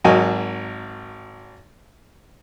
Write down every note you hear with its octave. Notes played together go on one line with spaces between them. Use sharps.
G#1 F#3 F#4 A#4 D#5 G#5